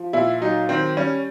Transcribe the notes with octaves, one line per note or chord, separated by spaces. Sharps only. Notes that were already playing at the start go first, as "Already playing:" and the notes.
Already playing: F3
A#2 E4
F#3 D#4
D#3 C4
G3 C#4